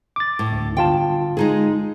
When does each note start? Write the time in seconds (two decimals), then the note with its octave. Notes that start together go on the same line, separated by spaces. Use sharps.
0.16 D6 A6
0.39 A2
0.52 D2
0.77 G1 F4 G5 A5
1.37 G#3 D#4 G#4